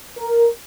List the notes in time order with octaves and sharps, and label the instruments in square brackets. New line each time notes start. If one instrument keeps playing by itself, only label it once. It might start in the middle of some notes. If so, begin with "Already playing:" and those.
[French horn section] A#4